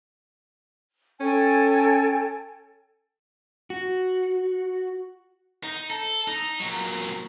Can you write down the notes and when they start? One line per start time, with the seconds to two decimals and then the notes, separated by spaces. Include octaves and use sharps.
1.20 C#4 A4 G5 G#5
3.70 F#4
5.64 D#4
5.90 A4
6.28 D#4
6.60 A#2 F#3